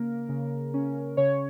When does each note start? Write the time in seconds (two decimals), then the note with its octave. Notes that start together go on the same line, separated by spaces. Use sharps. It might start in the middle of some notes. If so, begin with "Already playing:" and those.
Already playing: C#3 A#3 A#4
0.29 C#3
0.74 C#4
1.17 C#3 C#5